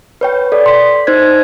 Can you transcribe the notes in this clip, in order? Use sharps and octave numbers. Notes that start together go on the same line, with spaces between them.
B4 C#5 G5
A4 D5
C6 B6
D#4 C5 G#6